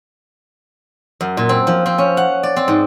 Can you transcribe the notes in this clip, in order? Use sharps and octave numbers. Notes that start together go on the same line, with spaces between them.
F#2
A#2
C4
F3
C4
C#4
F#5
D5
C4
G#2